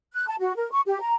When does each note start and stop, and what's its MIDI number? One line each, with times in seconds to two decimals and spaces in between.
0.14 0.26 90
0.27 0.35 81
0.40 0.55 66
0.55 0.70 70
0.72 0.81 85
0.86 1.00 67
1.01 1.14 82